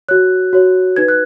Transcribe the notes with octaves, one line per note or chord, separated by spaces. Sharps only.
F#4 C#5 F#6
F#4 C#5
D#4 B4 G#6
F#6